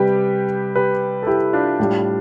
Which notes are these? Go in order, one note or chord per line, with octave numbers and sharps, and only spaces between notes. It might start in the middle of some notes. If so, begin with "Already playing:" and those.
Already playing: C3 G3 G4 B4
G4 B4
A4
E4 G4
D4 F4
A2 G3